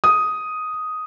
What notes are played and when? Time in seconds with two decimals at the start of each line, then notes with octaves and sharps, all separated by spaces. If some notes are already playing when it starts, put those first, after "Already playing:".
0.04 D#6